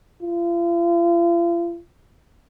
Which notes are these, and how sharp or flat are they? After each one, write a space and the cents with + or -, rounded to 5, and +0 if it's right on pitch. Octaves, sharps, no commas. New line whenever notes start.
F4 -40